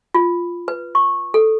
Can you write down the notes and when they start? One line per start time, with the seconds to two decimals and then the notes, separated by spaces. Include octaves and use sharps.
0.14 F4
0.68 B4
0.95 C#6
1.34 A4